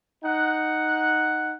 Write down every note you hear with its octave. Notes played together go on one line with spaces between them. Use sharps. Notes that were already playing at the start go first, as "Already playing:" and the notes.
D#4 F#5